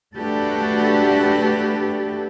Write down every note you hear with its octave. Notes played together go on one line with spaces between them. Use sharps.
A3 D4 F#4 G4 A4 B4